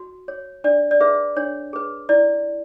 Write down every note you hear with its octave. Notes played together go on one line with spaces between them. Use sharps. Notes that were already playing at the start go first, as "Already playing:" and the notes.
Already playing: F#4
C#5
D4 D5
D5
G#4 B4 E5
D4 C#5
G#4 B4
E4 D5